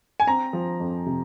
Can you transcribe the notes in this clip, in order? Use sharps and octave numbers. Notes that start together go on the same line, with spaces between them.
G#5
C4 A#5
F3
F2
C3